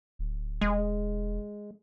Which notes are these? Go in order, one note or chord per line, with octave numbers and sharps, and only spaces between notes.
D1
E1 G#3